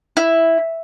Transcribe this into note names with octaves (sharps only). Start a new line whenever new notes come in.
E4